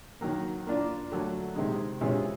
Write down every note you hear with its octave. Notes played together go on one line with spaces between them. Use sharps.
D#3 F#3 A#3
A#3 D4 F4
D3 F#3 A3
C3 D#3 G#3
C3 E3 G#3 C#4 F4